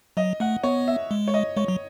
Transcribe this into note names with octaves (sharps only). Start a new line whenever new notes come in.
F#3 D#5
A3 F#5
B3 C#5
E5
G#3
C#5
D#5
G#3 C#5
F#3